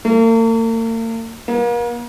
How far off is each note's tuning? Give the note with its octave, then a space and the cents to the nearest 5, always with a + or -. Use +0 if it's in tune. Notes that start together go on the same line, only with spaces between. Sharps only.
A#3 -45
A#3 +40